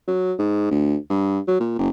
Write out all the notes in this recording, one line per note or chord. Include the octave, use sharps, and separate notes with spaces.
F#3
G#2
D2
G2
F#3
A#2
F#1